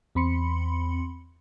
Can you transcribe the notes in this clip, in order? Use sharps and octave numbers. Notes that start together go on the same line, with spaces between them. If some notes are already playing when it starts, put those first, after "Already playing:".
E2 C4 B5 C6 C#7